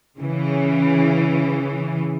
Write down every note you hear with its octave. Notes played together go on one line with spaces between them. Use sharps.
C#3 E3